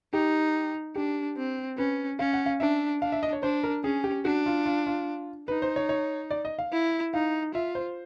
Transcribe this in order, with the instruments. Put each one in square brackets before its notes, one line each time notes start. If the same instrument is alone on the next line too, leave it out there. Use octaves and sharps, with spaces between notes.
[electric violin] D#4 [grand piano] G4
[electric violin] D4 [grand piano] G4
[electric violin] C4
[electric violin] C#4 [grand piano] B4
[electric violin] C#4 [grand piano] F5
[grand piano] F#5
F5
[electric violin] D4 [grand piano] E5
[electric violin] D4 [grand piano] F5
[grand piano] E5
D#5
C#5
[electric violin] D4 [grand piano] C5
[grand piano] A#4
[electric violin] C#4 [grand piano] G#4
[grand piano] G4
[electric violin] D4 [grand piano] F#4
[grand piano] F4
F4
F4
[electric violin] D#4 [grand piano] B4
[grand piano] C5
C#5
C#5
D5
D#5
F5
[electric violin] E4
[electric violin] D#4 [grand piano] F5
[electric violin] F4 [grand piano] E5
[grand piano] C5